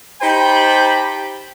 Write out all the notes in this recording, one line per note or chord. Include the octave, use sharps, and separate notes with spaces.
D#4 G4 C5 G5 A5 B5